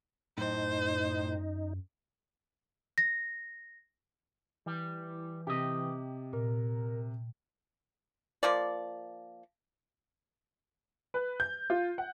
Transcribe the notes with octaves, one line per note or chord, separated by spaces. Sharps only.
F#2 A2 D#4 C5
A#6
E3 G3
C3 G4 D#5
A#2 A#4
F3 A#3 D5
B4
G6
F4
F#5